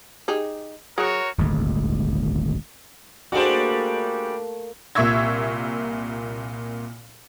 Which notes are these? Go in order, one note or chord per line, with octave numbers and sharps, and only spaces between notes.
D#4 G4 G#4
F#3 F#4 G#4 A#4 C#5
D#1 G#1 D2 G#3
G3 A3 A#3 D4 F#4 G#4 C5
C2 A#2 E5 C#6 E6 G#6